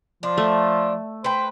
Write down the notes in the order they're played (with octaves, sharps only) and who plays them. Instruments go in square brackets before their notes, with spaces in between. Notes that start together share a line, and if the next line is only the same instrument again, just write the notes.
[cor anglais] F3 [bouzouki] D4
[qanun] A3
[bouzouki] B4 G5 [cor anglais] C5